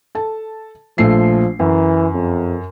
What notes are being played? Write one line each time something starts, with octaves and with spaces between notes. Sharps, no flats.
A4 A5
A#1 F3 A3 C7
F#2 E3
F2